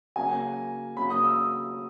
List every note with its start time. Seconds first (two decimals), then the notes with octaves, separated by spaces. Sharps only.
0.16 C#3 F#3 A#3 G#5
0.97 C#3 F#3 A#3 B5
1.10 D#6
1.24 E6